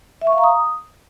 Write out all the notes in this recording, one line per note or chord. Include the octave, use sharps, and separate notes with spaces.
E5
C#6
F5
A#5
D#6